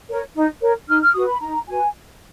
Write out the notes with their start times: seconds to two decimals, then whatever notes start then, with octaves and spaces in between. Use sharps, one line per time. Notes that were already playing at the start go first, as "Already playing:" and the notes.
0.09 A#4 C#5
0.36 D#4
0.61 A#4 C#5
0.88 D#4 F6
1.02 F6
1.14 F#4 B4 D#6
1.28 B5
1.41 D#4 A#5
1.67 F#4 B4 G#5